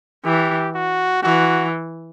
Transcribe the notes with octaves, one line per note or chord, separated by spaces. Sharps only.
E3 G4
F#4
E3 F#4